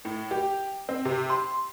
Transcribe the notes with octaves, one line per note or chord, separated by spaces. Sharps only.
A2
G4
C4
C3
C6